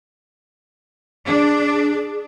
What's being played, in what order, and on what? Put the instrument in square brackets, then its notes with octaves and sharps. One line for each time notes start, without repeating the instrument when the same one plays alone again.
[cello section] D4 [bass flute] G#4